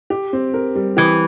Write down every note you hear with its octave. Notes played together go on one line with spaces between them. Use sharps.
G4
C4
A#4
G3
E3 G4